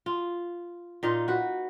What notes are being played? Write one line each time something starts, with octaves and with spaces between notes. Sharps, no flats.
F4
A#2 D#4 F4
F#4 B4